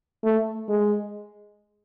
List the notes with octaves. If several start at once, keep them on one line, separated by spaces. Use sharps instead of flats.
A3
G#3